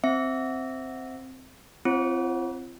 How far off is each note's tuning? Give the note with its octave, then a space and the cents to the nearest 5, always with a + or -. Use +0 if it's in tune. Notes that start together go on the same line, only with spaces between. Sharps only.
C4 +0 E5 -5
C4 +0 F4 -35 C#5 -45